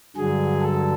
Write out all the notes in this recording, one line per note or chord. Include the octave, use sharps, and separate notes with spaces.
G2 D3 F#3 G#4
A4